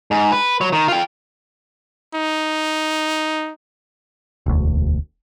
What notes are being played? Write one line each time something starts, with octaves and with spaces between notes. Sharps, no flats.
G#2
B4
F#3
D#3
F4 G5
D#4
E1 D2